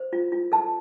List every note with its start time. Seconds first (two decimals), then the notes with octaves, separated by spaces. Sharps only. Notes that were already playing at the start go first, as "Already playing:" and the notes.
Already playing: C5
0.13 F4
0.32 F4
0.52 A4 A5